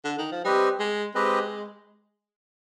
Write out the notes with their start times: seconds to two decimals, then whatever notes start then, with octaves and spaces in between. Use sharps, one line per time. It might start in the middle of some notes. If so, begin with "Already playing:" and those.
0.05 D3
0.18 D#3
0.32 F3
0.45 G3 C4 G4 B4 D#5
0.80 G#3
1.15 G#3 C4 G4 B4 D#5